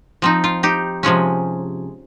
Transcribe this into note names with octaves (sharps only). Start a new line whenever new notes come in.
F3 C4 D#4
F4
D#4 G4
C3 F3 G#3 C#4